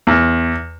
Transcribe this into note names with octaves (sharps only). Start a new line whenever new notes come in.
E2